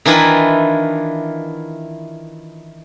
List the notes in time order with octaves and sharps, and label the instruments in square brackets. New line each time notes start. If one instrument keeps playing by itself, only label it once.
[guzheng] D#3 E3 D4 E4 F4